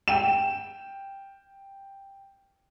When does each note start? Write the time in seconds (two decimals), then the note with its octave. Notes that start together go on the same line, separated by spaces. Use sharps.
0.08 G5 E7